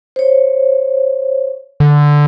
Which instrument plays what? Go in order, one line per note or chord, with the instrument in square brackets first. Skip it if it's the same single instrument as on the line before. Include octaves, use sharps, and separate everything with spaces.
[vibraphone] C5 C#5
[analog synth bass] D3